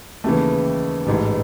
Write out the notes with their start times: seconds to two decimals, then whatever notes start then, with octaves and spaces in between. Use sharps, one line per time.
0.24 D#2 C#3 E3 A3
1.06 A1 G#2 E3